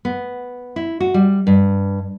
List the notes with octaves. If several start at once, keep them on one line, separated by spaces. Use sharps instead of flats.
B3
E4
F#4
G3
G2